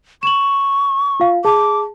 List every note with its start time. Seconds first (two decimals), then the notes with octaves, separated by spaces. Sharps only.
0.23 C#6 E7 F#7
1.20 F4 F5
1.45 G#4 A5 D6